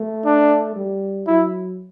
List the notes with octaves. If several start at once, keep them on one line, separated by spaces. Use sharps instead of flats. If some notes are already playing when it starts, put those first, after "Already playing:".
Already playing: A3
D4
G3
F#3 E4